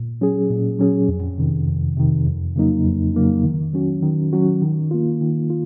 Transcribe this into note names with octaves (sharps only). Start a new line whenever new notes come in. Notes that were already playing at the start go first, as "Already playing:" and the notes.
Already playing: A#2
F#3 C#4 G#4
A#2
F#3 C#4 G#4
F2
C3 D#3
F2
C3 D#3
F2
C#3 F#3 A#3 D#4
F2
C#3 F#3 A#3 D#4
D#3
F#3 C#4 F#4
D#3
F#3 C#4 F#4
D#3
A#3 F4
D#3
F4